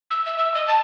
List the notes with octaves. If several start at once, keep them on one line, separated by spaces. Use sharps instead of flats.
E6
E5
E6
D#5
A5